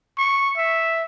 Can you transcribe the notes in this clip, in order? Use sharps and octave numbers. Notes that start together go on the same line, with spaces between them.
C#6
E5